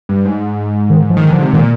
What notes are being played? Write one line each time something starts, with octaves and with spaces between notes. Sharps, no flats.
G2
G#2
D#3
F3
D#3
D3 F3
C3
A#2 D#3